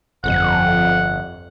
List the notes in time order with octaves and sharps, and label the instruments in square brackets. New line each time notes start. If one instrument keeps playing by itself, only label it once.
[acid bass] G1 [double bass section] F2 [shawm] F#5